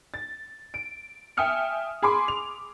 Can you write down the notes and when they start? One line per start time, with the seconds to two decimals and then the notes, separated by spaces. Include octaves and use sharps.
0.14 A6
0.74 D7
1.37 E5 G5 G#5 D#6 F6 C#7
2.02 G#4 G#5 B5 C6 D6
2.28 F7